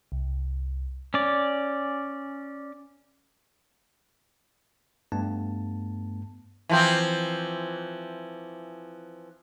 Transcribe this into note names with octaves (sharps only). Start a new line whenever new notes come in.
C2
C#4 D5
G2 A3 B3 A5
E3 F3 C4